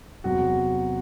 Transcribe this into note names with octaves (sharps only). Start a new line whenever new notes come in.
E2 C3 F#3 C4 F#4